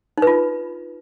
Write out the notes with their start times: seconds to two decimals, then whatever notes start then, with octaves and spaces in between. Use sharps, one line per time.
0.18 D#4
0.22 B4
0.27 F4